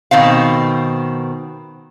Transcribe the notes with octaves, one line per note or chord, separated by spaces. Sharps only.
B2 D#3 C4 F5